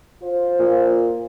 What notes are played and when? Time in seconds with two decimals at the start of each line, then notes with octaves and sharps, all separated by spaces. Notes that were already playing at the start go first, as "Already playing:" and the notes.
0.21 F4 C5
0.59 A#2